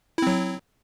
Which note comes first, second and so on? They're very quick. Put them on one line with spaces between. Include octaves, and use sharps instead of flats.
E4 C4 F#3